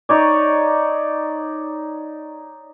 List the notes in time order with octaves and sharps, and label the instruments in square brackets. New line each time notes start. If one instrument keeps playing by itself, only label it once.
[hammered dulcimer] D#4 C#5 D5